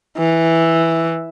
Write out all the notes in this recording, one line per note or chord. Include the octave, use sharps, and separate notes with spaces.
E3